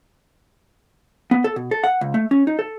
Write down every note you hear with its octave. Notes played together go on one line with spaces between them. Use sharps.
B3
A4
B2
A4
F#5
C#2
A3
C#4
D#4
A4